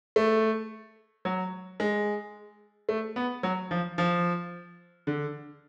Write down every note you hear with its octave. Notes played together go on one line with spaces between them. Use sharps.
A3
F#3
G#3
A3
B3
F#3
F3
F3
D3